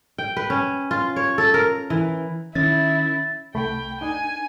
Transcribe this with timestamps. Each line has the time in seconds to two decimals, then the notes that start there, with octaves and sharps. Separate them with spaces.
0.18 G5
0.37 B4
0.50 C#4
0.91 F4
1.16 C#5
1.38 A4
1.54 A#4
1.90 E3
2.55 D#3 C#4 E4 A6
3.54 C2 A3 G5 B5
4.01 D4 D#4 G#5